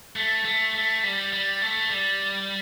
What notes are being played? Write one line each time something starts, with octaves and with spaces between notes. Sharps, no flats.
A3
A3
A3
G3
G3
A3
G3